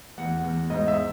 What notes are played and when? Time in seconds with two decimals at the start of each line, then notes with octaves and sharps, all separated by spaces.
0.18 E2 F#5
0.44 E2
0.70 G#2 D#5
0.88 E5